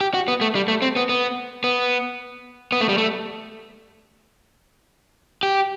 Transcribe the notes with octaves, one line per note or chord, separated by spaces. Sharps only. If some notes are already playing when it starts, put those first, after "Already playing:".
G4
F#4
B3
A3
G3
A3
C4
B3
B3
B3
B3
A3
G3
A3
G4